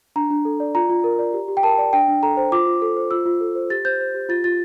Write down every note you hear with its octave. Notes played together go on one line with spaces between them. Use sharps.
D4 A#5
D4
A4
D5
F4 A#5
F4
A#4
D5
G4
G4
G5
A#4 A5
D5
D4 G5
D4
A4 A#5
C5
F4 D6
F4
A4
C5
F4 E6
F4
A4
C5
G4 A6
C5 G6
C5
G4
F4 A6
F4 A6